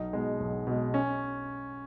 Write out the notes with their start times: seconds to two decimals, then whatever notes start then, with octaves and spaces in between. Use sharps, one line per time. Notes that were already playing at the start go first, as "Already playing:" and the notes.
Already playing: B1 D#4
0.13 B2 G#3
0.40 B1
0.67 B2 G#3
0.94 C#4